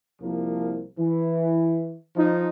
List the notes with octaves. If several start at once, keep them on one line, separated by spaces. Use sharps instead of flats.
C2 F3 A#3
E3
F3 D#4